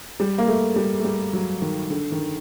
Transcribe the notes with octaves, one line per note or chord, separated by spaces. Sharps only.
G3
A#3
A3
G3
A3
G3
F#3
D#3
D3
D#3